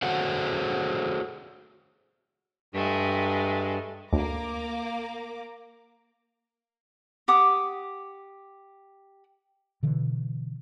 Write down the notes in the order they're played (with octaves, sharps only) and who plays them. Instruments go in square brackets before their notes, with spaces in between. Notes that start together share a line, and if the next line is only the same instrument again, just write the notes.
[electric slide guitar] F#4 G#4 A4 C5 C#5 F#5
[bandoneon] G2 [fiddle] G#3 A3
[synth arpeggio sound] D2 [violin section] A#3 A#5 D6
[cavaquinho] G4 F#5 D6 D#6
[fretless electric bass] B2 D3 E3